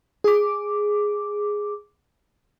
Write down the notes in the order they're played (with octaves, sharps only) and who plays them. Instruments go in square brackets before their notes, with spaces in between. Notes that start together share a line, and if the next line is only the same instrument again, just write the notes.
[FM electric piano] G#4 D6